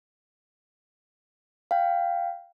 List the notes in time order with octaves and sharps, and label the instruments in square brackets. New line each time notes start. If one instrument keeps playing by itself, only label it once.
[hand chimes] F5 G5